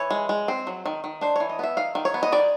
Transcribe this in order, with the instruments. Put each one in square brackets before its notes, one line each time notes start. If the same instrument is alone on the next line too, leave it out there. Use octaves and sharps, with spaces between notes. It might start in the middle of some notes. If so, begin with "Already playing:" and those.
Already playing: [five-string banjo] E3 C#5
G#3
G#3
C4
F#3
D#3
D#3
D4 C5
E3 C#5
D#5
B3 E5
D#3 F5
D#3
C#5
B3
D#5
D#3 D5